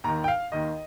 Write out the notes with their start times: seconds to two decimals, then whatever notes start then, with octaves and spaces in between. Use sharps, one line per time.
0.04 D#2 D#3 A#5
0.24 G5
0.28 F5
0.52 D#2 D#3 D#5